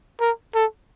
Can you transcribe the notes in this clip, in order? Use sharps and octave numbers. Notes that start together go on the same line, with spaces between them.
A#4
A4